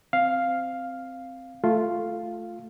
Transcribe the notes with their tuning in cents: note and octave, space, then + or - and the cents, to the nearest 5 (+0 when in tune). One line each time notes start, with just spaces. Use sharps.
C4 +0 F5 +0
A3 +0 F4 +0